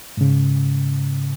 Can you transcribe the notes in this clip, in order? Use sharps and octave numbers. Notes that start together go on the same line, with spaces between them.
G#2 C#3